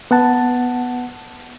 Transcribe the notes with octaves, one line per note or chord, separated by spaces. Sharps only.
B3 F#5 A5